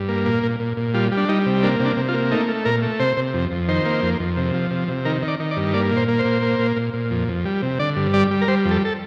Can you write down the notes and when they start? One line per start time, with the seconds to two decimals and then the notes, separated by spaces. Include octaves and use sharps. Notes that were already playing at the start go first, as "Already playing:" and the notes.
Already playing: G2
0.08 A#3
0.26 A#2
0.43 A#2
0.60 A#2
0.77 A#2
0.94 G3 F4
1.12 G3
1.17 D4
1.29 G3 D#4
1.46 C3
1.63 A#3 D4
1.80 C3
1.85 D4
1.97 C3
2.08 F4
2.14 A#3
2.31 A3 D#4
2.48 A3
2.65 A#2 A#4
2.82 A3
3.00 C3 C5
3.17 C3
3.34 F2
3.51 F2
3.68 D#3 C5
3.85 A#3
4.02 F2
4.20 F2
4.37 C3
4.54 F3
4.71 C3
4.88 C3
5.05 D#3 A#4
5.22 D#3
5.28 D5
5.40 D#3
5.51 D5
5.56 G2
5.74 A#3 D5
5.91 A#2
5.97 C5
6.08 A#3
6.19 C5
6.25 A#2
6.42 A#3
6.59 A#2
6.77 A#2
6.94 A#2
7.11 F2
7.28 F2
7.45 G3
7.62 C3
7.79 D3 D5
7.96 G2
8.13 G3 D5
8.31 G3
8.41 A#4
8.48 G3 C5
8.65 F2
8.71 A4
8.85 A4